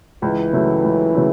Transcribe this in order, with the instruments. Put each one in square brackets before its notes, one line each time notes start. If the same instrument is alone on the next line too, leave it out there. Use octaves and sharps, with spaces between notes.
[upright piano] C#2 [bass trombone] E3
[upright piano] C#3 F#3 A3
C#2
C#3 F#3 A3